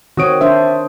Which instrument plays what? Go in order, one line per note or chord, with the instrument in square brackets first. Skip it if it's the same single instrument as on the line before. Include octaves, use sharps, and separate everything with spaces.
[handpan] D#3 C4 C#5 [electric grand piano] F#4 D#6 D7
[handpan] D4 C5 [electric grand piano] E5